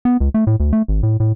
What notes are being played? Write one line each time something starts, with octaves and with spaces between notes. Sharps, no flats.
B3
C#2
A3
A2
D2
A3
G#1
A2
A2